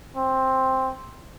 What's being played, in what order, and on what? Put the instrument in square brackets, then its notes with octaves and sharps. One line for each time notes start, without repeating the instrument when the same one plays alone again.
[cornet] C4